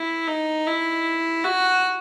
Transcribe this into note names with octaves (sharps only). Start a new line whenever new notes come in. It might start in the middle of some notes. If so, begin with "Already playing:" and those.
Already playing: E4
D#4
E4
F#4